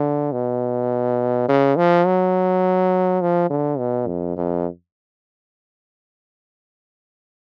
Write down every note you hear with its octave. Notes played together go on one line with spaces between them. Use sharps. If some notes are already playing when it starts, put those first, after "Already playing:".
Already playing: D3
B2
C#3
F3
F#3
F3
D3
B2
F2
F2